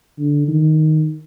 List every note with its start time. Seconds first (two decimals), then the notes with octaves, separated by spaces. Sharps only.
0.19 D3
0.48 D#3